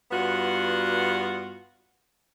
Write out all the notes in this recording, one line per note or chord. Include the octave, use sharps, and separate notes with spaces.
G2 B3 F4 F#4 F#5